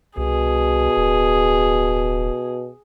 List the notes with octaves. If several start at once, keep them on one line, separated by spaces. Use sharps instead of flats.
C2 B2 G#4
D1